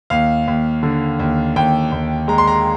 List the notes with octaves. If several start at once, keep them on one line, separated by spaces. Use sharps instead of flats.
D#2 F5
D#2
D3
D#2
D#2 G5
D#2
G#3 A#5
C6
A#5